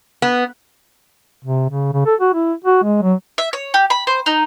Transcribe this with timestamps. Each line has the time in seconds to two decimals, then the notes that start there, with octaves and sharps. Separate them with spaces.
0.22 B3
1.44 C3
1.70 C#3
1.93 C#3
2.06 A4
2.21 F#4
2.34 E4
2.65 F#4
2.84 G#3
3.02 F#3
3.38 E5
3.53 C#5
3.74 G4
3.90 B5
4.07 C5
4.26 D#4